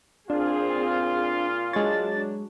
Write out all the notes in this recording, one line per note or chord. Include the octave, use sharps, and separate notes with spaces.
A#2 C4 D4 F4 G#4
F#3 G#3 D4 C#5 A6